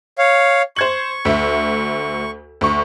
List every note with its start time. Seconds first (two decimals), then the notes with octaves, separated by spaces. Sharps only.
0.18 C#5 F5
0.76 C5 C#6 G#6 F#7
1.25 D2 E5
2.61 D2 C#6